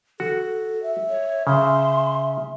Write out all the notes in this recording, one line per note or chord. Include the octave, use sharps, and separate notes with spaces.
F#4 A4
E5
C#5
C#3 E5 C6